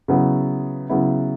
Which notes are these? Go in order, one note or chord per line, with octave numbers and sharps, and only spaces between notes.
C#3 F#3 B3 E4
C#3 F#3 B3 E4